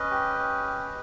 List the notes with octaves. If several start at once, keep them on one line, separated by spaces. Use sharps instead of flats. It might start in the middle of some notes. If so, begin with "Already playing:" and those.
Already playing: C#4 B4 D#5
G4
C#4
G4